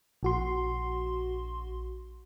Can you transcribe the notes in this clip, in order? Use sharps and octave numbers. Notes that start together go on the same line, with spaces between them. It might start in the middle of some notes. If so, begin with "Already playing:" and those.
A#1 F#4 C6